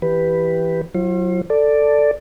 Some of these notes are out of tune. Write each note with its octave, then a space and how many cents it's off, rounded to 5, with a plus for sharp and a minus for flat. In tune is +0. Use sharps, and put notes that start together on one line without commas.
E3 +0 G4 +0 B4 +0
F#3 +0 F4 -45 C5 +35
A4 +10 D5 +0